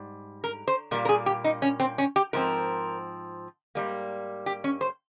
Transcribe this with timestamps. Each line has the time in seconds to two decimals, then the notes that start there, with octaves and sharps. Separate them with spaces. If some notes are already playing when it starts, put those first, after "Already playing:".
Already playing: G#2 G3
0.44 A#4
0.68 C5
0.91 A#2 G3 A#3 A#4
1.05 A#4
1.09 G#4
1.26 G4
1.44 D#4
1.62 C#4
1.80 C4
1.98 C#4
2.16 G4
2.33 G#2 F3 C4 A#4
3.75 G#2 G3 A#3
4.46 G4
4.64 C#4
4.81 C5